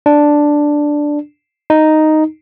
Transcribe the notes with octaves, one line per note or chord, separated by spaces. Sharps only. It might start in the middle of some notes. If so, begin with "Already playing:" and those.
D4
D#4